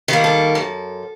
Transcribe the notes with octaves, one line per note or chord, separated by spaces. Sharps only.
D#3 G3 A#3
A4
F#2